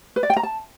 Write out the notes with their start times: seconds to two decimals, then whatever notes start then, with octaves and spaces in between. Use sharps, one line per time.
0.16 B4
0.23 D5
0.30 G5
0.37 A#5
0.43 A5